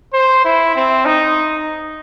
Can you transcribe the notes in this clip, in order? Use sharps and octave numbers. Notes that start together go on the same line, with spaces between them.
C5
E4
C4
D#4